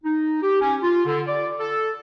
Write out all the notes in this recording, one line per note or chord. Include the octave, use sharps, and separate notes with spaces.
D#4
G4
C#4
F4
D3
D5
A4